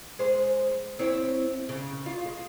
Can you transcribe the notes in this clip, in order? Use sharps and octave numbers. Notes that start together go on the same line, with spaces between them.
G#3 G#4 C5
C4 E4 C#5
C#3
F4
G#3